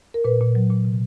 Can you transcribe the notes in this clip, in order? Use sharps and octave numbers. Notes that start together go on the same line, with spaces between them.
A#4
A#2 B4
A#2
F#3
A#2
C3